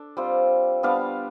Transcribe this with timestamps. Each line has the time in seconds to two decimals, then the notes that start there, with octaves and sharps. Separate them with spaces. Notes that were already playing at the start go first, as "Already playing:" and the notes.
Already playing: D4 A4
0.17 G3 C4 F4
0.83 G3 B3 D4 F5